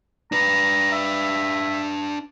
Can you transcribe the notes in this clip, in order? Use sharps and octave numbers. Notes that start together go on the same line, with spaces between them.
D4 B4 A#5
E5